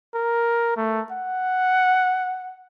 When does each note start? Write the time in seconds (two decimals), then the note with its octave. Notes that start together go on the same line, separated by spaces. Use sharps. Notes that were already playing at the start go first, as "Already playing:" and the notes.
0.15 A#4
0.77 A3
1.12 F#5